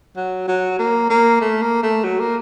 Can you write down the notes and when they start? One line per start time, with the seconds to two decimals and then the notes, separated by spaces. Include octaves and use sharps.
0.17 F#3
0.48 F#3
0.79 A#3
1.10 A#3
1.41 A3
1.62 A#3
1.83 A3
2.04 F#3
2.20 A#3